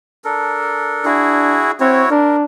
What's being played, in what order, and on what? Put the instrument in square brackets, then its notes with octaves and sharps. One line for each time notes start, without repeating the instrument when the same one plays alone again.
[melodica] D4 A4 A#4
[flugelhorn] D4 [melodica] E4 F#4 G#4
[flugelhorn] C4 [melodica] E4 F#4 C#5
[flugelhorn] D4 [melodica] A#4